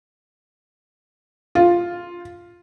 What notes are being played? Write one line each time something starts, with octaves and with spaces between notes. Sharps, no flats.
F4